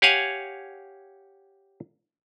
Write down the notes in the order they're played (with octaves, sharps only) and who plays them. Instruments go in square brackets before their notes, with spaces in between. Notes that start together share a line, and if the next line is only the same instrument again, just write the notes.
[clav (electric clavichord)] G4 C#5 F5 F#5 G#5